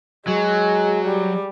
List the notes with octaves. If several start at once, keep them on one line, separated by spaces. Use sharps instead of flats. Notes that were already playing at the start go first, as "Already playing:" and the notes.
F#3 G#3
G3